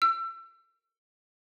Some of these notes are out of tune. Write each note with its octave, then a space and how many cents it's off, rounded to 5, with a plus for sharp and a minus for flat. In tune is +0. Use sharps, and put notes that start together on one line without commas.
E6 +30